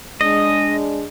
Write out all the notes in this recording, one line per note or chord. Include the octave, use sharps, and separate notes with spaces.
G#3 D4 D#5